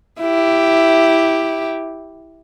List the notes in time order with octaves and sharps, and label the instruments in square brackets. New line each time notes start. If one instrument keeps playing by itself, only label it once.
[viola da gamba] E4 G4